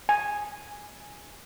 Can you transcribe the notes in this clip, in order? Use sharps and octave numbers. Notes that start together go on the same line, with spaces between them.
G#5